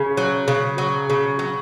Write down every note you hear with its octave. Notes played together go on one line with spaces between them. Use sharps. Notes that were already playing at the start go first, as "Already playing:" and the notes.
Already playing: C#3 C#4
F#3
C#3
F#3
C#3
F#3